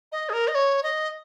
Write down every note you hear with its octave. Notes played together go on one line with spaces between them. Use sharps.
D#5
G#4
A#4
D#5
C#5
D#5